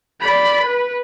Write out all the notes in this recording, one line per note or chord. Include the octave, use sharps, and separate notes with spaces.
D5 B5
B4